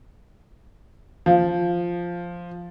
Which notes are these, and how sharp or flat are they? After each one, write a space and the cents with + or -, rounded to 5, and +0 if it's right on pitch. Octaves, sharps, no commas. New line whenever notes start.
F3 +0